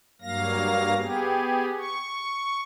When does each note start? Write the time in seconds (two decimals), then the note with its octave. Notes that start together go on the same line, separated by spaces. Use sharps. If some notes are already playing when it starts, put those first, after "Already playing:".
0.21 G2 F#3 A#3 F5 A#6
0.99 B3 G4 G#4
1.78 C#6